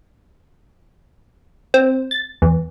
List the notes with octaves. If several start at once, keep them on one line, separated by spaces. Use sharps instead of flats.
C4
A6
E2